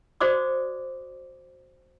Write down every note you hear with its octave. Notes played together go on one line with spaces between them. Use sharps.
F#4 C5 D5 D6 D#6